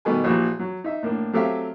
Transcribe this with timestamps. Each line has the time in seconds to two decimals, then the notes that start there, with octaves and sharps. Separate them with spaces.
0.05 B2 D#3 G3 A3 B4 G#5
0.24 A#1 A#2 E3 F#4 G4
0.59 F#3
0.84 D#4 E5
1.03 A2 A#3 D4
1.33 F#3 A3 C4 G4 E5 F5